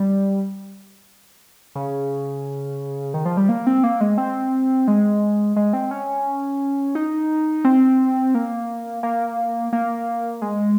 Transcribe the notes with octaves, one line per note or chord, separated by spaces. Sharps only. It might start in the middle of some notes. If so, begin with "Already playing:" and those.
Already playing: G3
C#3
D#3
F3
G3
A#3
C4
A#3
G#3
C4
G#3
G#3
C4
C#4
D#4
C4
A#3
A#3
A#3
G#3